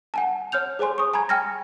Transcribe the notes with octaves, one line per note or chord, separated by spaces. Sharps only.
F#5 G#5 A5
C#5 F6 G6 F7
G#4 C5 C#5 G#5 C6
C#6 D#6
G#5 A#5 B5 G#6
G5 G#5 F6 G#6 A#6